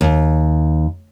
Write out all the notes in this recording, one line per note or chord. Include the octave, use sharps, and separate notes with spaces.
D#2